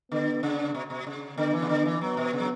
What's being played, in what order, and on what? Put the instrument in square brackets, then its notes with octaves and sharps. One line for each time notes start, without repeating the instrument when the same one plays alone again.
[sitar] D3 [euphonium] B3
[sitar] C#3 [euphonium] D4
[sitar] B2
B2
C#3
[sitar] D3 [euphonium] B3
[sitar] E3
C#3
D3
E3
[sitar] F#3 [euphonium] B3
[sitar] B2
C#3
F#3